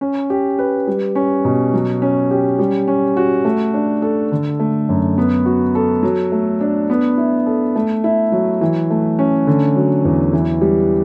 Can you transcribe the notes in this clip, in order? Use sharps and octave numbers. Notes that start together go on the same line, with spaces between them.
C#4
G4
B4
G3
C#4
B2
F#3
C#4
G4
G3
C#4
F#4
A3
D4
A4
D3
A3
F#2
B3
F#4
A4
F#3
A3
D4
B3
E4
A4
A3
E4
F#3
E3
A3
C#4
D3
F#3
E2
E3
G3